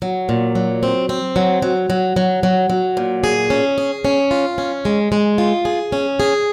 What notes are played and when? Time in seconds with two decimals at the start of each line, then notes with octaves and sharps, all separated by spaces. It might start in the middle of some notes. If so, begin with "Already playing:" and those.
0.02 F#3
0.29 A#2
0.55 F#3
0.83 C4
1.09 C4
1.36 F#3
1.62 F#3
1.90 F#3
2.16 F#3
2.43 F#3
2.70 F#3
2.97 A#2
3.24 G#4
3.50 C#4
3.78 G#4
4.05 C#4
4.31 F4
4.58 C#4
4.85 G#3
5.12 G#3
5.38 F4
5.65 G#4
5.92 C#4
6.20 G#4